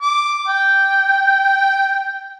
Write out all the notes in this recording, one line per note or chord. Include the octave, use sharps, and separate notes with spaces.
D6
G5